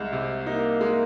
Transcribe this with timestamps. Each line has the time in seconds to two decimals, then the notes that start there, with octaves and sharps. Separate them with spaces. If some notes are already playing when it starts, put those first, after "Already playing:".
Already playing: C2 G#3
0.13 C3
0.46 A#3 D#4
0.81 G#3